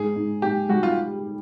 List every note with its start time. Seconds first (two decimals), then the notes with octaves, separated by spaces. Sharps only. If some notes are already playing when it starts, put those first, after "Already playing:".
Already playing: G#2 G#4
0.16 G#2
0.42 G#2 G4
0.69 G3 F#4
0.83 F4